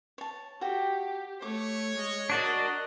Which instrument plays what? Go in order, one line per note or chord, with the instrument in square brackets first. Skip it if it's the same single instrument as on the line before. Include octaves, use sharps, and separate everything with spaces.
[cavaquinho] C#5 A5
[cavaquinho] F#4 A4 G5 [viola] G4
[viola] A3 [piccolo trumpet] C#5 [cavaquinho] D6
[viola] G#3 D#5
[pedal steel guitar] D4 F#4 D5 [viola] A#4 D#5